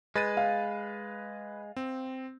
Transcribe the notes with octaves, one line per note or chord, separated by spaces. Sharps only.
G#3 B4 A6 D#7
F5
C4